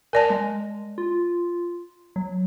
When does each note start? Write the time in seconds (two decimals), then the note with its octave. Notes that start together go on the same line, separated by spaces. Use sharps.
0.13 A#4 D5 G#5 A5
0.30 G#3
0.98 F4
2.16 F#3